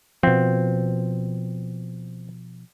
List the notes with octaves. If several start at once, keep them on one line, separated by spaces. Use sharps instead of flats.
B2 F3 C4